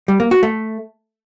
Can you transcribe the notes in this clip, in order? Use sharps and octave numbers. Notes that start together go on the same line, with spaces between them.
G3
A#3
F#4
A3